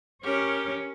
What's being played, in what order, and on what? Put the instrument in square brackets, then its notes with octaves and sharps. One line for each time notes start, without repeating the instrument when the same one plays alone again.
[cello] C#4 C#5 [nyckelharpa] G4 A#4